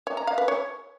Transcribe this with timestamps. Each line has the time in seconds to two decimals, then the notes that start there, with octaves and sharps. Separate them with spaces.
0.07 C#5
0.17 A#5
0.27 F5
0.38 B4
0.48 C#5